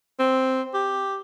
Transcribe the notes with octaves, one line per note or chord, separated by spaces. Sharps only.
C4
G4